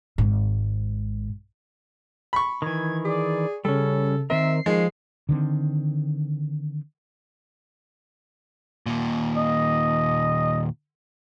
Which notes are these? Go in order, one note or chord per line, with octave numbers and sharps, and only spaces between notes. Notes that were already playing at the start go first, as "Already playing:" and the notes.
G#1 G#2
B5 C#6
D#3 E3 G#6
G#4 D5
C#3 G3 C#4 A4
D#3 C4 A#4 E5 C7
D#3 F3 G#3
D3 D#3 B3 C4
D#2 A#2
D#5